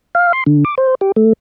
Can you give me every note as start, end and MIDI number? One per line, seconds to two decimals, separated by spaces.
0.15 0.32 77
0.33 0.44 84
0.46 0.64 50
0.65 0.75 86
0.78 0.95 72
1.01 1.12 67
1.16 1.33 57